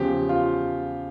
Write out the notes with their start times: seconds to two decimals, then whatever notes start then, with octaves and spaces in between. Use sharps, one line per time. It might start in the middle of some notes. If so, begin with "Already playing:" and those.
Already playing: E2 C#3 F3 G4
0.29 F4